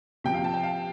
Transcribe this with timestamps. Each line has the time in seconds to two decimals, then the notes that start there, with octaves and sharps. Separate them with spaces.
0.24 C3 F3 G5
0.34 F5
0.44 A5
0.54 G5
0.63 F5